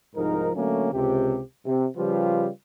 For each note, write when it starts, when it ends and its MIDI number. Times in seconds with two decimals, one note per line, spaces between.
0.16 0.50 36
0.16 0.50 44
0.16 0.50 53
0.16 0.50 63
0.16 0.50 70
0.55 0.92 50
0.55 0.92 54
0.55 0.92 57
0.55 0.92 58
0.55 0.92 61
0.93 1.40 37
0.93 1.40 48
0.93 1.40 67
1.65 1.87 48
1.97 2.48 49
1.97 2.48 53
1.97 2.48 55
1.97 2.48 65
1.97 2.48 67
1.97 2.48 71